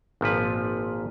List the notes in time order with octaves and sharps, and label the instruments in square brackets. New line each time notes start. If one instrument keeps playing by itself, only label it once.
[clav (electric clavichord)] G#1 A#2 F3 B4